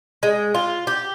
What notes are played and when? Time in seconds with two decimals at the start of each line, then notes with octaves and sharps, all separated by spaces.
0.23 G#3
0.55 F4
0.87 G4